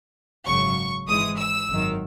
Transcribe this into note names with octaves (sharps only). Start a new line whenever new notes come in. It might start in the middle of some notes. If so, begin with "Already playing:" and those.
G#1 F#2 C#3 F#3 C#6
G#1 G#2 E3 G#3 D#6
E6
G#1 F#2 D#3